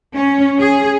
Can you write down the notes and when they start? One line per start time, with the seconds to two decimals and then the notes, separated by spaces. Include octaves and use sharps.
0.15 C#4
0.60 G#4